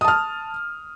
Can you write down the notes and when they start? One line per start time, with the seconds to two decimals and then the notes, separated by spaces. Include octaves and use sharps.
0.01 D#6
0.04 A5
0.08 F6